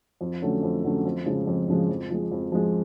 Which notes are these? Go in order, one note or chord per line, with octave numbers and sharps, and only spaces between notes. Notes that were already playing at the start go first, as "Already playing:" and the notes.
F2
D3 F#3 A3 C#4
F2
D3 F#3 A3 C#4
F2
C#3 F3 G#3
F2
C#3 F3 G#3
F2
F3 G#3
F2
F3 G#3